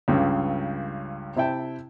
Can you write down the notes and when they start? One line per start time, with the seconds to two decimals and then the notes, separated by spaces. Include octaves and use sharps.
0.08 C#2 G2 C#3
1.36 C3 E4 E5 G5 A5